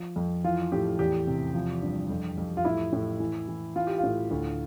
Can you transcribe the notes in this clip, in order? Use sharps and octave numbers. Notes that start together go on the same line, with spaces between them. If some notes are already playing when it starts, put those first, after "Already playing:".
Already playing: F3
F2
E3 F4
A2 G4
E2 G4
C3
F3
G2
F2
F2
F4
A2 E4
A2
E3
E3
E3 F4
G4
F4
A2
D2